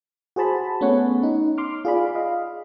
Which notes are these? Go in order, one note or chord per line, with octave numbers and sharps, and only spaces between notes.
F#4 G#4 C5 A5 B5
A3 B3 C#4 B4 C#5 F#5
D#4
C6 D6 F6
F4 G#4 D5 F5 B5
D#5 F5